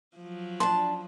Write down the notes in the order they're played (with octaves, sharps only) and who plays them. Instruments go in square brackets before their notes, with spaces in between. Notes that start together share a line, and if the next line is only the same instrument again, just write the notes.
[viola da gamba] F3 F#3
[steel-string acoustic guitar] D4 A5 [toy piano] C6